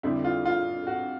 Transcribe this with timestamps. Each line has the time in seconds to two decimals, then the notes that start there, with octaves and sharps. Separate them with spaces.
0.03 F2 D3 G3 E4
0.24 F4
0.45 F4
0.87 F#4